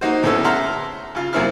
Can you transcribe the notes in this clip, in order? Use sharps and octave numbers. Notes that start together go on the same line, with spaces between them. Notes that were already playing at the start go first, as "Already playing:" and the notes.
A#3 D#4 F#4 C5
D2 A2 B3 C#4 A4 E6
E5 F#5 A5 A#5 C6 F6
C#3 F4
C2 F#2 A#3 C4 E4 F6